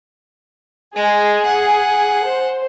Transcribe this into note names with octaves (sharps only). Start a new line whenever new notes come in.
G#3 G#4
F#5
C5